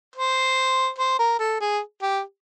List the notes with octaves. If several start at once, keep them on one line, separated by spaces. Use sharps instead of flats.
C5
C5
A#4
A4
G#4
G4